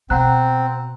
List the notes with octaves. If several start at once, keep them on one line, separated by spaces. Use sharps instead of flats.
B2 C4 F#5 A#5 F#6